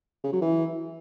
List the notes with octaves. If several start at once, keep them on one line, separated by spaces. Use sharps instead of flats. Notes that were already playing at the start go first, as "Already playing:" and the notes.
C#3
F#3
E3